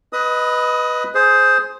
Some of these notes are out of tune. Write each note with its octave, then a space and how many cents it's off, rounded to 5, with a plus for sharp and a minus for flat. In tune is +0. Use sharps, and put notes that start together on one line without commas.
B4 +0 D#5 +0 D#6 +25
G#4 +15 C5 +0